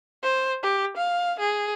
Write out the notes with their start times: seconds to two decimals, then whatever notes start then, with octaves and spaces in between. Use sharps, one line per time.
0.23 C5
0.63 G4
0.97 F5
1.40 G#4